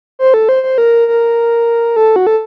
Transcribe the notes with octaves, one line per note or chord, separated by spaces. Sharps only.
C5
A4
C5
C5
A#4
A#4
A4
F#4
A4